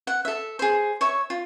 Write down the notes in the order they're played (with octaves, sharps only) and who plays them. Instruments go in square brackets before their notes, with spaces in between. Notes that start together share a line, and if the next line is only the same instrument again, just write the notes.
[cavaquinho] F#5
A4 E5
G#4 C5
C#5 E5 C#6
F4